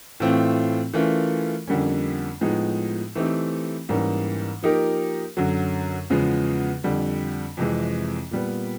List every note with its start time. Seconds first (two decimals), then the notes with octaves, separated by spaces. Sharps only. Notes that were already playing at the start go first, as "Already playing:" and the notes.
0.20 A2 E3 A3 C4 F4
0.94 E3 A3 C#4 F4 A#4
1.67 F2 D3 G3 A#3 C#4
2.41 A2 F3 G#3 B3 D#4
3.15 E3 A3 C4 D#4 G4
3.89 G#2 E3 G3 A#3 C#4
4.63 F3 A#3 D#4 G4 A#4
5.37 F#2 D3 F#3
6.10 E2 C#3 F3 G#3 B3
6.84 F2 D3 G3
7.57 F2 C3 E3 G#3
8.31 A#2 G3 B3